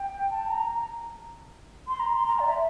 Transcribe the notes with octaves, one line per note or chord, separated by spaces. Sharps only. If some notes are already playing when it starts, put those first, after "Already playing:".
Already playing: G5
A5
A#5
C6
A#5
C6
A#5
D5
E5